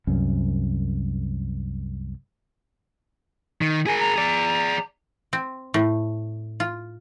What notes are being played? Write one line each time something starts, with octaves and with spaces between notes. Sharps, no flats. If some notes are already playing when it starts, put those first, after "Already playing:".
C2 F#2
D#3
G#4 A#4 G#5
A#5
G#4 D5
C4
A2
F4